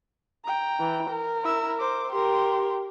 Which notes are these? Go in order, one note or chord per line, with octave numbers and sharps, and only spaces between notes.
G5 A#5
E3
A#4
E4 E6
C5 D6
G4 A#4 C6